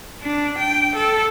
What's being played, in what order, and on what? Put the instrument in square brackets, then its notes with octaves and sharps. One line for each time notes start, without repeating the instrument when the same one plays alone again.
[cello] D4
G5
A4